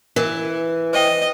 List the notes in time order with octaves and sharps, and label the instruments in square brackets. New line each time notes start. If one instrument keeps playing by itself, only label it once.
[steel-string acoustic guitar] E3 [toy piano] A#4
[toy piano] C5 G5 [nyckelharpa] D#5